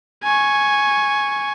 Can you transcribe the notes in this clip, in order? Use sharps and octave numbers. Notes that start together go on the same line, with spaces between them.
G#5 C#6